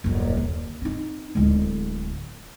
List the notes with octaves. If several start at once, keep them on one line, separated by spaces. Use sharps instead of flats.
D#1 F#2
D#2
C4 D#4
D1 G#3